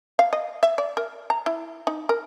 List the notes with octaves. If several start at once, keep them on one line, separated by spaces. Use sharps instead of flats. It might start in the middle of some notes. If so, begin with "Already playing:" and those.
F5
D#5
E5
D5
A#4
A#5
E4
D#4
A#4